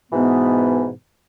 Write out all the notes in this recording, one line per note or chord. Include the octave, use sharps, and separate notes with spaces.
G#2 B2 E3 B3